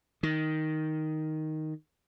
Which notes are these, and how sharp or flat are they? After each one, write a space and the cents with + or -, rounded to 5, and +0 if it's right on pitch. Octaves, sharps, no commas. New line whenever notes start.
D#3 +5